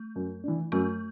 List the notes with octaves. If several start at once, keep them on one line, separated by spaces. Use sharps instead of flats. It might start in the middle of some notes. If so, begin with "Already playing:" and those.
Already playing: A3
F#2
E3 D4
F#2 A3